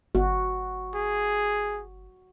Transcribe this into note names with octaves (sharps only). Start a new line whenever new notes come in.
G1 F#4
G#4